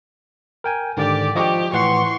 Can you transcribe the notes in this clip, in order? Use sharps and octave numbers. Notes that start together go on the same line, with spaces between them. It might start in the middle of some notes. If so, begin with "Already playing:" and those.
A#4 G5 G#5
G#2 D3 D#3 G4 D5
F3 G4 D#5 C#6
A2 E3 F#5 C6 C#6